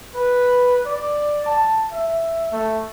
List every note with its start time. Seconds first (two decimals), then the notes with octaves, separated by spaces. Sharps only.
0.15 B4
0.86 D5
1.46 A5
1.92 E5
2.52 A3